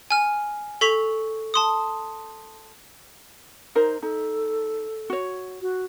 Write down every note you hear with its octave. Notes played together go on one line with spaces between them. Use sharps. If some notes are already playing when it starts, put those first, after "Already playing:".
G#5 F6
A4 C#6 B6 F7
A5 C6 D#6
D#4 A#4 C5
D#4 A4
F#4 C#5
F#4